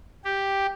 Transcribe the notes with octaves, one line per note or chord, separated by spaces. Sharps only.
G4